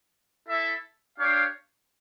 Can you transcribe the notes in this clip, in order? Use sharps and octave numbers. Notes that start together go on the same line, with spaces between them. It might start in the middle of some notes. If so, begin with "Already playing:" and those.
E4 A4 E5
D4 G4 C#5 F5